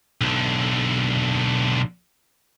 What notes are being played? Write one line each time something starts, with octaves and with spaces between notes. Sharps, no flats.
B1 D3